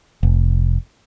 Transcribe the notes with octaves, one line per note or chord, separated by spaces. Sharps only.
F1